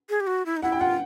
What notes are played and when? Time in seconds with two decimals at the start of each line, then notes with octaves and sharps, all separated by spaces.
0.10 G#4
0.21 G4
0.27 F#4
0.46 E4
0.57 D#4
0.62 E4 F#5
0.72 G5
0.80 F4 F#5